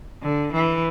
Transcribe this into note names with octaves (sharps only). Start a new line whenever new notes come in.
D3
E3